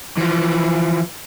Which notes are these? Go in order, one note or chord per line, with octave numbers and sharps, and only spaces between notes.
E3 F3